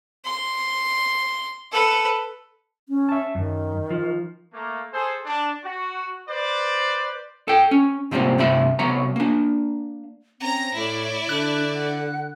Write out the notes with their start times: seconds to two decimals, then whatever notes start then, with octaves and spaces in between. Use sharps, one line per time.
0.25 C6
1.72 A4 B4
2.89 C#4
3.09 E5 A5
3.35 F#2 D#3
3.90 F3
4.52 A3 A#3
4.92 G#4 A4 C5
5.26 D4
5.63 F#4
6.28 B4 C5 D5
7.48 A4 G5
7.71 C#4
8.11 G#2 C3 F3 G3 A#3 C4
8.38 G2 C3 A3 E5 B5
8.79 C2 F#3 B3 C#5 A#5
9.16 A#3 D4
10.40 C4 C#4 A#5 A#6
10.74 A2 E4 C#5 D5
11.29 D3 D4 F#6
11.75 F#5